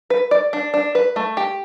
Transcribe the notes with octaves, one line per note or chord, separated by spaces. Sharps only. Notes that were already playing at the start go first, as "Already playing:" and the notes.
B4
D5
D4
D4
B4
A3
G4